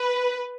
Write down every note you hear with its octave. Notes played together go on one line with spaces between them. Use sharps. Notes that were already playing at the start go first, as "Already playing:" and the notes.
Already playing: B4